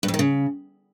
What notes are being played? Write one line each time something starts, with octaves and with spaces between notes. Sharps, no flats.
G2
F2
D#3
C#3